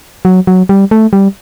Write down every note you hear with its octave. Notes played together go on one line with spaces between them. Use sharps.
F#3
F#3
G3
A3
G3